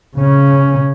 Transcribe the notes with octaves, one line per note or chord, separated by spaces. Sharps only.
C#3 C#4